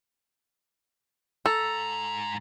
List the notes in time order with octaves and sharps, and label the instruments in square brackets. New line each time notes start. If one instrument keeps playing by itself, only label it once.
[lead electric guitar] G#2 A#5 [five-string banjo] A4